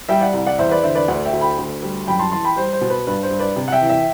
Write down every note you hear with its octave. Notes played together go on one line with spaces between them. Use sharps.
G3 E5 G5
D5 F#5
C2
D5 F#5
E2 C5 E5
B4 D5
D3 C5 E5
B4 D5
D2 D5 F#5
E5 G5
D2
G5 B5
D2
G3
F#2 G5 B5
A5 C6
E3 A5 C6
G5 B5
G3 C5
C5
B2
B4
G2 B4
C5
G2
B4 D5
C3
F#5
E5 G5
E3
E5 G5